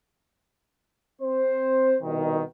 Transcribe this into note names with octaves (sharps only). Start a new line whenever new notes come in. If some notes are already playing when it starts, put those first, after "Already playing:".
C4 C5
C2 B2 D#3